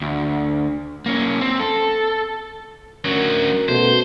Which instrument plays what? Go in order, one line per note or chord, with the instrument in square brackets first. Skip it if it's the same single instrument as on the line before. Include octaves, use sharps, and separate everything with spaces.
[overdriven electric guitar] D2
A#3 C#4
C4
A4
[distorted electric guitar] D2 F#3 [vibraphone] C#4 F#4 [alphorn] A#4
[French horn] B2 [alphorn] A3 [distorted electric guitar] C5